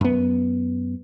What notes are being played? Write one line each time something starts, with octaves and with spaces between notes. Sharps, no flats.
F#2 B3